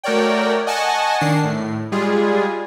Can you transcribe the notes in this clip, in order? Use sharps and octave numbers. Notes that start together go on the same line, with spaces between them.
A3 F#4 A#4 C#5 D5 G5
D#5 F#5 G#5 A5 C#6
D#3 D4 C7
A2
G3 G#3 F4 G#4